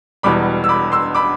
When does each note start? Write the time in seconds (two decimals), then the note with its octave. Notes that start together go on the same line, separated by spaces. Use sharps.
0.23 E1 E2 B2 G3 B5 D6
0.64 E6
0.69 B5 D6
0.92 C6 E6
1.15 B5 D6